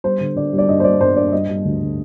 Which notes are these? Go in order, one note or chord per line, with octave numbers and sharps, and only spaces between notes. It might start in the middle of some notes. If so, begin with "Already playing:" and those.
G3 C5
D3
D3 D5
G3
D5
G2 D#5
C5
G3 D5
G2 C5
G2 D5
G3 D#5
G3
D2
D3